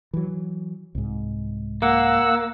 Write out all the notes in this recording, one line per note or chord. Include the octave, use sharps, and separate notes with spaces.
E3 F#3
C2 G#2
A#3 F#5 E6